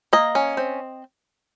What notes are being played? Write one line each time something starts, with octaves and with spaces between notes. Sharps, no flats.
A#3 D#5
C#4
C4